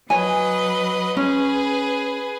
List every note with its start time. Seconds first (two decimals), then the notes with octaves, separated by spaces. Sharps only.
0.10 F#3 B4 C#5 D#5 G#5
1.17 C#4 G#4 B4